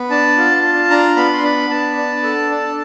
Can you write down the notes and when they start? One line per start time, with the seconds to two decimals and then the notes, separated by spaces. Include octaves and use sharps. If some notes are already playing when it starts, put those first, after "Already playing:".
Already playing: B3
0.10 D4 A5
0.38 F4
0.63 F4
0.90 D4 A#5
1.16 B3 B5
1.33 C6
1.43 D4 B5
1.70 B3 A5
1.96 D4
2.23 A4
2.50 D4